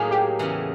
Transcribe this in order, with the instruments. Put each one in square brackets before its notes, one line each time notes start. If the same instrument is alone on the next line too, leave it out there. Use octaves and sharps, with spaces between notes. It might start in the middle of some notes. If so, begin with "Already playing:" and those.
Already playing: [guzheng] A2 F#3 A#3 D#4 [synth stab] G#4
[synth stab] G4
[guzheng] E2 C#3 E3